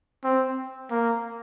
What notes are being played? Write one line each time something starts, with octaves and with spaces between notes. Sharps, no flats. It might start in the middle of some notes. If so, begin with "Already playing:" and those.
C4
A#3